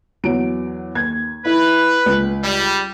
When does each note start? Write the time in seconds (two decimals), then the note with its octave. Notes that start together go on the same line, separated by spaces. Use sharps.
0.24 E2 F#3 D7
0.95 D#2 G#6
1.45 E4 B4
2.06 C#2
2.44 G3